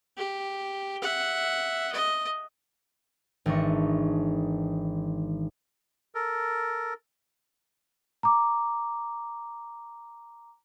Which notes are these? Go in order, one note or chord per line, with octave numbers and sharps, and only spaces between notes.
G4
E5 F#5
D#5
G#1 D#3 E3 D4 D#5 C#6
A4 A#4
A#5 D6